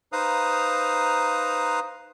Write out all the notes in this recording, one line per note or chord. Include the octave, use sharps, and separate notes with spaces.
D#4 B4 C5 F5 A#5 D#6